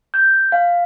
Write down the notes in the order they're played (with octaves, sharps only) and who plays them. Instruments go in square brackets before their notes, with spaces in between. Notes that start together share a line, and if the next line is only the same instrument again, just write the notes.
[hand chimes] G6
F5